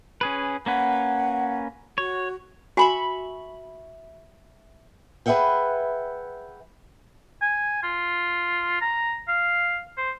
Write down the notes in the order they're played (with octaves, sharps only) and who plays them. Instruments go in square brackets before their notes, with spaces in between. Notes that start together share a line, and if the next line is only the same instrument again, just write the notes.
[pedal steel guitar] C#4 G#4 B4
[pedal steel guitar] A#3 C#4 B4 [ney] F#5
[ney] F#4 [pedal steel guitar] C#5
[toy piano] F#4 G#5 [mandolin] E5 B5 C#6
[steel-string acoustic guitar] G#4 B4 D#5 E5 F#5 G5
[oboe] G#5
F4
A#5
F5
C5